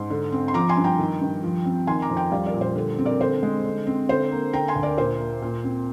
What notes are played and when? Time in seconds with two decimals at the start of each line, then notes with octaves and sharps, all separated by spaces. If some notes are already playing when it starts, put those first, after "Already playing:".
Already playing: G#2 C6
0.10 D3
0.32 C4
0.48 C6
0.54 F3 A#5 D6
0.69 G#5 C6
0.77 G2
0.84 G5 A#5
0.99 D#3
1.21 G2
1.43 F3
1.66 C4
1.87 D#3 G#5 C6
2.02 A#5 D6
2.10 F2
2.17 G5 A#5
2.32 G3 D5 F5
2.46 A#4 D5
2.54 A#2
2.61 C5
2.76 D3
2.98 C4
3.05 A#4 D5
3.20 D3 C5
3.43 G#3
3.64 D3
3.87 C4
4.09 D3 C5
4.31 A#3
4.53 D3 G5 A#5
4.68 G#5 C6
4.76 D2
4.83 A#4 D5
4.97 A#2 C5
5.20 A#3
5.42 A#2
5.64 C4